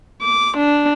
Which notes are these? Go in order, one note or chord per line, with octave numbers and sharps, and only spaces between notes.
D6
D4